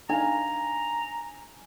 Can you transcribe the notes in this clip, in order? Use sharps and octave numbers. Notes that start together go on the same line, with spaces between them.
D4 D#4 F5 G#5 A#5